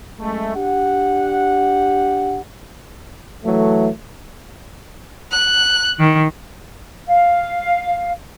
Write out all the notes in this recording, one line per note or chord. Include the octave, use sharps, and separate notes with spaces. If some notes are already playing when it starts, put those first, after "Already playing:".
F#2 G#3 A3
D4 G4 F#5
E3 F#3 A3
F#6
D#3
F5